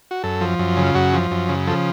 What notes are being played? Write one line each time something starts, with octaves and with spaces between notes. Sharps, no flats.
F#4
F#2 A4
F3
F#2
C#3
F4
F#2 F#4
F3
F#2
C#3
F3 A4